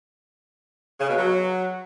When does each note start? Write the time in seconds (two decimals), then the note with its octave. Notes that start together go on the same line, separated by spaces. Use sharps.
0.99 C#3
1.09 B2
1.18 F#3